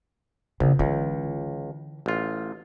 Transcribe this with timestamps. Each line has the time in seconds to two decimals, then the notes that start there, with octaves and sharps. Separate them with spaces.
0.60 A#1 C#3
0.79 C#2 D3 E3
2.06 A1 F4